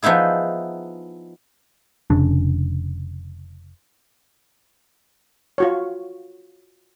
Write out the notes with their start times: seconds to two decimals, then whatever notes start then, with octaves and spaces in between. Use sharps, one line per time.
0.03 F3 B3 D#4 E4 G#4
2.10 F1 C#3 D4
5.58 F4 F#4 C#5